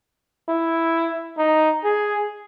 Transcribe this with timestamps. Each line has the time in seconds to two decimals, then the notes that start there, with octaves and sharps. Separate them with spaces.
0.49 E4
1.38 D#4
1.84 G#4